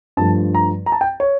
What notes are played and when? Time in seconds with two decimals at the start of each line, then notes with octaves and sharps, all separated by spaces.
0.17 G2 F3 A3 A5
0.55 A#5
0.86 A#5
0.92 A5
1.01 G5
1.20 C#5